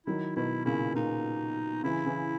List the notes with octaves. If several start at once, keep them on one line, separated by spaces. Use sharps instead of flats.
D#3 F#3 E4
B2 D#3 E4
A#2 C#3 E4
A#2 C#3 D#4
C#3 E3 E4
C#3 E3